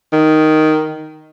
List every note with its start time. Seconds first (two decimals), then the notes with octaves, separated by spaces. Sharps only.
0.13 D#3